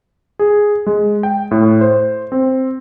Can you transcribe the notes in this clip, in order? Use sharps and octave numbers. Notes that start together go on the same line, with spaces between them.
G#4
G#3
G5
A2
C5
C4